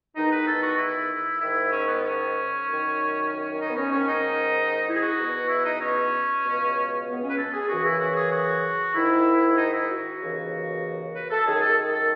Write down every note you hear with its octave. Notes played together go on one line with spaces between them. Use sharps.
E2 D#3 D#4
B4
A4
F#4
E4
G#2 D#3 E4
C#4
B3
C#4
F#2 D#3
C#4
D#4
B3
C#4
G#2 D#3 C#4
D#4
E4
G#4
F#4
E2 B2
E4
D#4
C#4
C#2 B2
B3
C#4
B4
A4
G#4
F#2 C#3 E3 F#4
E4
F#4
G#4
F#4
G#2 D#3 E4
D#4
E4
F#4
D#2 C#3 E3
B4
A4
F#2 D#3 G#4
A4
A4